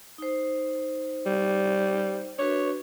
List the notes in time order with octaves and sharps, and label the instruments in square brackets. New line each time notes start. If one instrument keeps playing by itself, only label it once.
[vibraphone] D#4 C5
[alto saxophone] G3
[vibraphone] D4 F#4 B4 [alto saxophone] C#5